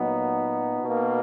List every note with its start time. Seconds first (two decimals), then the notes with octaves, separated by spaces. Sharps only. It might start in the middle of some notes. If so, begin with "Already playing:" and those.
Already playing: A#2 F#3 B3 D#4
0.81 B2 A#3